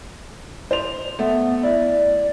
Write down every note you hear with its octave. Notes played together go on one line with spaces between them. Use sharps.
C5 F7
A3 B3
E4 D5